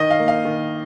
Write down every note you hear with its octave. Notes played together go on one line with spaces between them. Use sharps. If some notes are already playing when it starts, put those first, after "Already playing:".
Already playing: D#3 D#5
F5
A#3
F5
D#3